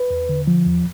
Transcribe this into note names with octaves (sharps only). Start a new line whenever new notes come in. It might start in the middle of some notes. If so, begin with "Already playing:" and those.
Already playing: B4
E2
D3
F3
E2